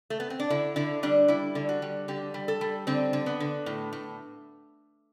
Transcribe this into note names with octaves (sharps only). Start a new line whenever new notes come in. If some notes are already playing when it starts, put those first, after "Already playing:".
A3
B3
C4
D4
D3 E4
D3 E4
G3 D4
G3 E4
D3
F#4
G3
D3 G4
G3
A4
G3
D3 C4
D3
B3
D3
A2
A2